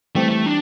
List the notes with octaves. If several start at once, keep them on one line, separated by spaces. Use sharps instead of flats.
E3 G3 A3 C4 G4
A3
D4